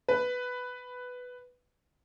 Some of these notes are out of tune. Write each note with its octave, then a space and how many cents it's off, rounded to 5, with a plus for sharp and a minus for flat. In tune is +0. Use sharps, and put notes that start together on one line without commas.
B4 +5